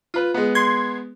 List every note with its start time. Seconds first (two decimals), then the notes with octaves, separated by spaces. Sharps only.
0.14 F4 B4
0.34 G#3 B3
0.55 C6 G#6